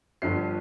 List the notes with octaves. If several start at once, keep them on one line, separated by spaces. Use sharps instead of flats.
G1 G2 F3 C7